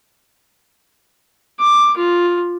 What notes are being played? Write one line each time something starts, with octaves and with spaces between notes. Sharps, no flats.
D6
F4